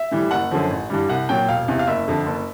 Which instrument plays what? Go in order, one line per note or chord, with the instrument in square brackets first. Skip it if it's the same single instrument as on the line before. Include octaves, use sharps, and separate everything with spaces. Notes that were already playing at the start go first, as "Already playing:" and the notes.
Already playing: [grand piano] E5
A2 E3 G3
F#1 F#5
F#2 D3 F3
A1
G2 E3 G3
C2 F#5
A#2 F#3 G5
E1 F5
E2 C3
F5
F#1 E5
F2 D3
F#1